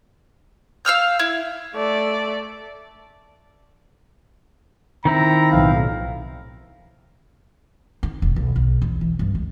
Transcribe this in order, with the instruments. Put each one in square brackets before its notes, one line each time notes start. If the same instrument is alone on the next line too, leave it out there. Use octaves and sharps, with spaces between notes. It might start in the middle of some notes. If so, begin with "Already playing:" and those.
[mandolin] F5 E6 F6 G6
E4
[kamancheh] A3 D5
[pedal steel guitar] D#3 C4 E4 [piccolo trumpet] A#5
[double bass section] B1 A2 F3 [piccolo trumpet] F5
[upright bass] D#4
E1
B1
B1
E2
E3
G2
C#2